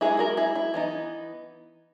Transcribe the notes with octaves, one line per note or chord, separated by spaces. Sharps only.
G#3 B3 D#4 E4 G#4
F#4 A#4
E4 G#4
E4
E3 B3 D#4